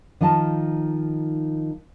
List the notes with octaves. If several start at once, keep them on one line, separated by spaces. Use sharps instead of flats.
D#3 F3 D#4 A5